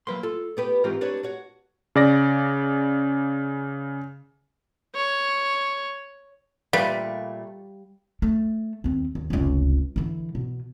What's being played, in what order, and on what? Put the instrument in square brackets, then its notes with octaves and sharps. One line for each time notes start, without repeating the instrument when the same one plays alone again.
[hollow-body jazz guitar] F#3 B4 C6 [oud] A#3
[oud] F4 [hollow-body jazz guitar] A4
[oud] B3 G4 B4
[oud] G#2 E3 F4 [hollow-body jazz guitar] C4 G4 A#4
[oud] D4 B4 C#5
F#4 C#5
[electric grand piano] C#3 D5 A#6
[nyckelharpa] C#5
[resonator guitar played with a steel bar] A#2 A3 [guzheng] G3 [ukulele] B4 D5 [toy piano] F5
[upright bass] A3
D#2 C4
D#2
F1 C#2
D3 E3
B2